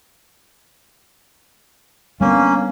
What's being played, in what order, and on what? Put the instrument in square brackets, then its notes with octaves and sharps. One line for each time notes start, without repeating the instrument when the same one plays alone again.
[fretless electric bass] G3 B3 D4 [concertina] A#3 C#4